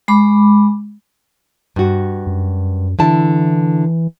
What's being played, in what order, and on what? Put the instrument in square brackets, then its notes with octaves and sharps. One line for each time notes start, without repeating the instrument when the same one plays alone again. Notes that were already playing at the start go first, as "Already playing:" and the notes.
[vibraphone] G#3 B5 D6
[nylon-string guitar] G2 F#4
[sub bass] F#2
[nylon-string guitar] D3 E4 A5 [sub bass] E3